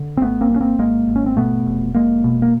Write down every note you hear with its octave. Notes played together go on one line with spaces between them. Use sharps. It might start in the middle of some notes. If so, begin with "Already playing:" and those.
Already playing: D3
C4
G#1 A3 B3
A#3 C4
G2
C#4
A#3 C4
G#1 G#3 A#3
G#1
C#4
C4
B2 A3 B3
F1
F1 G#3 A#3
B2
A#3